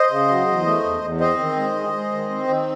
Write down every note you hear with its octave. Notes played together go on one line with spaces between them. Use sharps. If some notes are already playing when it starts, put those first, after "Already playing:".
Already playing: C5 D#5
C#3
F#3
E2
A3
E2
E2
C4 C5 D#5
D#3
G#3
G#3
G#3
D#3
C4
D#3